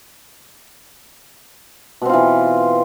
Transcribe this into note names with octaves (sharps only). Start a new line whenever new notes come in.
B2 E3 C4 F4